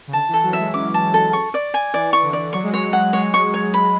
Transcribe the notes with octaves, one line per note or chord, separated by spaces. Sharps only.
C#3
D3 A5
E3
A4
F#3
E5
G#3
C#4 D6
A5
A4
C#6
D5
G#5
E3 D5
C#6
D3
D5
F#3 C#6
G#3
F#3 C#5
F#5
G#3 C#5
C#6
C#5
B5